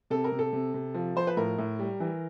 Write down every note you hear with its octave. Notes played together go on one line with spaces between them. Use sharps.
C3 A4
A#4
C3
A4
C3
C3
F3
F3 C5
B4
A2 A#4
A2
G3
E3